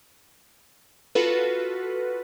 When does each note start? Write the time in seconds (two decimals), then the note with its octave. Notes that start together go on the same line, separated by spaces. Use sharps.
1.15 F4 F#4 A4 B4